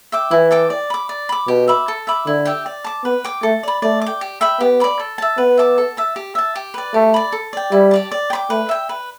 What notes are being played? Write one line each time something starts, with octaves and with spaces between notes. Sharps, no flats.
E5 G5 D6
E3 E4
A4 G5 D6
D5
B5 D6
D5
B5 D6
B2 G4
E5 B5 D6
A4
E5 B5 D6
D3 E4
G4 E5 G5
D5
A5 D6
B3 B4
G5 D6
A3 A4
D5 B5
A3 D5
D6
G5
G4
E5 G5 B5
B3 G4
D5 B5 D6
A4
E5 A5
B3 B4
E5 A5 D6
A4
E5 A5
G4
E5 A5
G4
B4 D5
A3 G4
D5 B5
A4
D5 G5
G3 E4
G4 D5 A5
D5
G5 B5 D6
A3 B4
E5 G5
B4